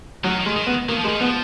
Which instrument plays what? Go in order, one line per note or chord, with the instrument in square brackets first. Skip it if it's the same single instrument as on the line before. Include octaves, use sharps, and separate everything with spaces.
[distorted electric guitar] D#3 [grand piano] F#3
[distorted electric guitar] D#3
[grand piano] G#3
[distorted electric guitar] D#3
[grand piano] B3
[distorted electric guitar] D#3 [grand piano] A#3
[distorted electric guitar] F3
[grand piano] G#3
[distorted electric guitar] D#3
[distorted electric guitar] F3 [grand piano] B3